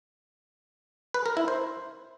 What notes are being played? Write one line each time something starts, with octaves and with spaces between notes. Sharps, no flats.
B4
A#4
E4
C5